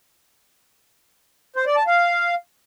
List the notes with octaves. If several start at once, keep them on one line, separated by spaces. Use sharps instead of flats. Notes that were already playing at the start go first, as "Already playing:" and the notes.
C5
D5
A5
F5